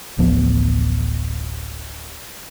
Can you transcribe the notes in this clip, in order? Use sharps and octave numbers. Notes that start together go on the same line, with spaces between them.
D1 A1 F3 B3